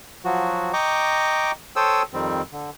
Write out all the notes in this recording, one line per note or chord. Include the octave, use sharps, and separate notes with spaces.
F3 F#3 F#4
D#5 G5 A#5 C#6 D6
A4 C5 C#5 G5 D#6 E6
F2 D#3 G3 C4
D3